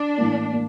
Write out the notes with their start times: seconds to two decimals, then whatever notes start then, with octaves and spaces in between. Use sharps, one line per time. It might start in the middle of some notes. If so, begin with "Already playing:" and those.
Already playing: D4
0.17 A2 E3 A#3
0.53 A#3